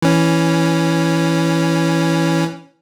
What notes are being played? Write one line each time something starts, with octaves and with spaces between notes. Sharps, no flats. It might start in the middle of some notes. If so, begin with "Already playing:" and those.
E3 C#4